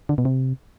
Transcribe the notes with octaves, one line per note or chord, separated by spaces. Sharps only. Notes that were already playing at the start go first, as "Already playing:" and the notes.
D3
B2
C3